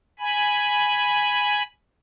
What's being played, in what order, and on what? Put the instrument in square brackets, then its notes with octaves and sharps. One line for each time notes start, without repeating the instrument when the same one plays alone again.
[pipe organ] G#5 B5